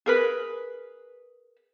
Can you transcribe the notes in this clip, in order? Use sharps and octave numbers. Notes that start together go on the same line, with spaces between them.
G#4 A#4 B4